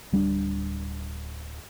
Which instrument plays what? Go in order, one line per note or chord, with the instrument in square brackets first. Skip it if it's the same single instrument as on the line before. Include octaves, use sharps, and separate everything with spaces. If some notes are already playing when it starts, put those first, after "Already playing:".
[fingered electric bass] D1 G3 C#4 D4